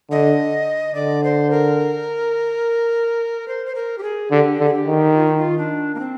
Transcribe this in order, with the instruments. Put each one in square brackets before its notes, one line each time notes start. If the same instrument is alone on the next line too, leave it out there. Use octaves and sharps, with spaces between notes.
[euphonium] D3 [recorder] D#5
[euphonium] D3 [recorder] D5
[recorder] C5
A#4
C5
C5
A#4
G4
G#4
[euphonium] D3 [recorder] G4
[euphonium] D3
[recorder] G#4
G4
[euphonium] D#3
[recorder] F4
D#4
F4
D4
A#3
C4